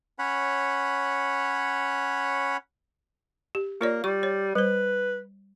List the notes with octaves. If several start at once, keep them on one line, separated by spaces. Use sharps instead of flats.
C#4 C#5 F#5 B5
G4
A#3 F4 C#5 D5
G3 C#6
C#5
G3 B4 C5